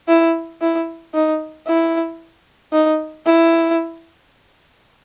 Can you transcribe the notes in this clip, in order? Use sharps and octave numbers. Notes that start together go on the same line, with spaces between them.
E4
E4
D#4
E4
D#4
E4